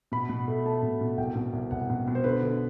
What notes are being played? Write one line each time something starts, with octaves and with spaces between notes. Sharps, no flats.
B2 B5
B2
A3
A3 A5
B2
B2
C2 G5
B2
C2
C2 F#5
B2
B2
C5
D3 B4
D3